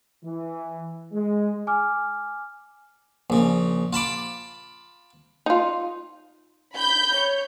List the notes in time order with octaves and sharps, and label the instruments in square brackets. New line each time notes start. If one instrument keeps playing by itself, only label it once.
[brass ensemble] E3
G#3
[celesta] G#5 D6 F6
[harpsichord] A#1 C#3
F4 A5 B5 D6
[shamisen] D#4 F4
[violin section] B5 G6
C#5